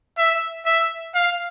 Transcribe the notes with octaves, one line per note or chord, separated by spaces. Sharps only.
E5
E5
F5